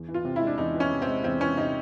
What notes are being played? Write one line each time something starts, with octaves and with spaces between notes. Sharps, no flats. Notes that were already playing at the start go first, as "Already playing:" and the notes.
Already playing: E2
E3
F4
C3
E4
G#3
D4
E2 D#4
E3
C#4
C3
C4
G#3
E2 C4
E3 C#4
C3 D#4